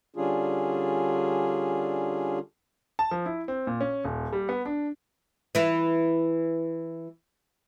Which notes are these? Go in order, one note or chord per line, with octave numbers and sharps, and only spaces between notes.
D3 G3 C#4 D4 F4 G#4
A5
F3
E4
C4
A#2
C#4
D#1
G3
B3
D4
E3 E4